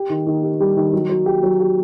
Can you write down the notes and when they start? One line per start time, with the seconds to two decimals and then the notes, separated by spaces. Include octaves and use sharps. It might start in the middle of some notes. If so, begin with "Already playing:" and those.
Already playing: G4
0.10 D#3
0.26 D#3
0.43 G4
0.60 G3
0.77 D#3
0.93 F#3
1.09 F#3
1.26 G4
1.43 F#3
1.60 G4